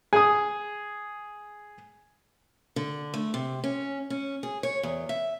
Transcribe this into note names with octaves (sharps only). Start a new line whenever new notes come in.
G#4 D#6
D3
A3
C3
C#4
C#4
G#4
C#5
E2
E5